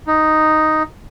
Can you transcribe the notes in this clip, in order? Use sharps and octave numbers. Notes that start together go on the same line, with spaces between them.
D#4